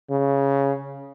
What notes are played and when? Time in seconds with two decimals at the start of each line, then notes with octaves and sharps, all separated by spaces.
0.10 C#3